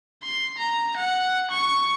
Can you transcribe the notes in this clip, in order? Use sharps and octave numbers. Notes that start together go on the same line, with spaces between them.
C6
A#5
F#5
C#6